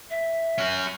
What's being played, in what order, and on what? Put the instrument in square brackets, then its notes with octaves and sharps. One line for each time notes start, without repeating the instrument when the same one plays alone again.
[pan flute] E5
[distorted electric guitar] C#4 F#4